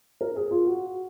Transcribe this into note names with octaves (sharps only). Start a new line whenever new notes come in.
A#4
G#4
F4
F#4